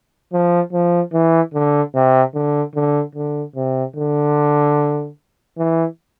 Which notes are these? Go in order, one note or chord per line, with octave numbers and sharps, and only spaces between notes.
F3
F3
E3
D3
C3
D3
D3
D3
C3
D3
E3